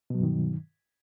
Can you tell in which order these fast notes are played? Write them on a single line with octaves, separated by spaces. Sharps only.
B2 F#3 G2 D#3